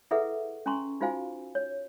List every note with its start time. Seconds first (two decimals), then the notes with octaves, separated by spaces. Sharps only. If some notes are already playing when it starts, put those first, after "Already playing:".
0.11 E4 G#4 A4 B4 E5 F#5
0.66 C#4 G#5 A#5 C6 C#6
1.01 D#4 F4 F#4 C5 F5 G#5
1.55 C#5